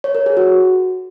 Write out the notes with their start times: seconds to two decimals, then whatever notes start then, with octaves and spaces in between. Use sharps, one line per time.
0.04 C#5
0.15 A#4
0.26 G#4
0.37 F#4